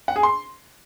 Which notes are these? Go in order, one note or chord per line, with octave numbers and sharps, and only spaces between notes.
F#5
G#4
C6